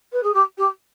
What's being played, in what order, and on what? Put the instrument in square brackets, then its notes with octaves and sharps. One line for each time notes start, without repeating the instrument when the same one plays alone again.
[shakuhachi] B4
G#4
G4
G4